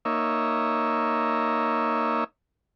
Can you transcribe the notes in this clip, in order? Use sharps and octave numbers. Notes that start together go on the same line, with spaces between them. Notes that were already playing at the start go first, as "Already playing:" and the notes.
A#3 D#4 C#5 E5